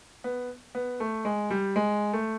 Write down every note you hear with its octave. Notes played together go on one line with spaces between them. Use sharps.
B3
B3
A3
G#3
G3
G#3
A3